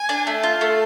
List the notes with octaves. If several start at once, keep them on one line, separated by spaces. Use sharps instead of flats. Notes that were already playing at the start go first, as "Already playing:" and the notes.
Already playing: G#5
D4
A3 A5
F4
A3